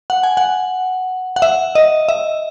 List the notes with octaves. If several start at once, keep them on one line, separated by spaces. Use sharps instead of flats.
F#5
G#5
F#5
F#5
E5
D#5
E5